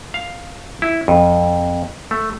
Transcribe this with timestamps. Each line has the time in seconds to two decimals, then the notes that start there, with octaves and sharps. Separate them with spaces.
0.14 F5
0.82 E4
1.08 F2
2.11 A3